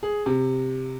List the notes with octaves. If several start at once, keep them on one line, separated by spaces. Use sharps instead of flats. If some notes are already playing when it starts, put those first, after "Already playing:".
G#4
C3